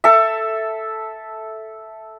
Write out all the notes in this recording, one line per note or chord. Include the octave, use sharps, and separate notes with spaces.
A4 E5